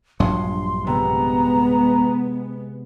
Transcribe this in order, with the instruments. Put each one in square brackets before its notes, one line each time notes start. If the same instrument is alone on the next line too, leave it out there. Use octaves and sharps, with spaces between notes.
[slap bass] A#1 G2 F#3 [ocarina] C6
[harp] C3 [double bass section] G#3 B3 [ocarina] A#5